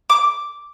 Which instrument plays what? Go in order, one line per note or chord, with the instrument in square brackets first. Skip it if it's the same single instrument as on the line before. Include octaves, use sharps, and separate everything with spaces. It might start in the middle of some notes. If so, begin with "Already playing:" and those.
[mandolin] D6